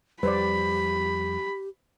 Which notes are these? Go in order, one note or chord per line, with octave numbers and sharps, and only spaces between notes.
F2 G3 G4 B4 C5 D5 B5